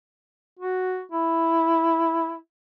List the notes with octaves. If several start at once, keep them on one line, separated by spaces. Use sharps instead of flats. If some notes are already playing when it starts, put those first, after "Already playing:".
F#4
E4